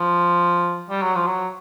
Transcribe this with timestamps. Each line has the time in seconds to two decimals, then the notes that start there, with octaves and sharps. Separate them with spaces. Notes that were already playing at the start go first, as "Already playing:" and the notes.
Already playing: F3
0.90 G3
1.02 F#3
1.15 F3
1.27 F#3